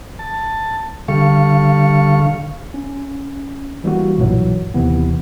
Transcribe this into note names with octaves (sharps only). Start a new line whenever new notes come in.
A5
D3 G3 A4 F5 C#6
C#4
E3 G3 A#3 F#4
B1 G2 A#2 E3 F#3
D#2 C3 E3 B3